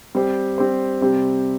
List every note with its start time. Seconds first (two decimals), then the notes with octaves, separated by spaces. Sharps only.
0.15 G3 C4 G4 C5
0.58 G3 C4 G4 C5
1.01 C3 G3 C4 G4